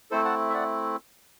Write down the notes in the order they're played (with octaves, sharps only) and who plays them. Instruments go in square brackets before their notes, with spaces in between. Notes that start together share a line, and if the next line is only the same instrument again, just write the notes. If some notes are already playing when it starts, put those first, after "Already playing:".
[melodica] A3 C4 E4 A4 C5
F#5 A5
E5
D5 F#5